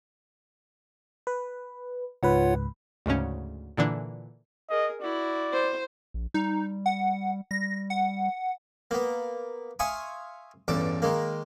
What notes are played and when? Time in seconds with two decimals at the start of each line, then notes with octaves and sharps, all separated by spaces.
1.27 B4
2.23 C#2 G#2 F4 B4 C#5 F#5
3.06 D2 G#2 C#3 C#4
3.77 A#2 D3 E3 D4
4.70 G#4 A#4 D#5
5.01 E4 F#4 D5
5.53 C5
6.14 A#1
6.34 G3 D#4
6.86 F#5
7.51 G3 A#6
7.90 F#5
8.91 A#3 B3
9.79 E5 F5 G#5 C6 C#6 D#6
10.68 A1 E2 G2 A4 D6
11.02 D#3 G#3 A#3